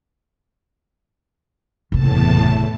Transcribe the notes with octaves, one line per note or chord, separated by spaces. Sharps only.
F#1 E2 A2 C3 A5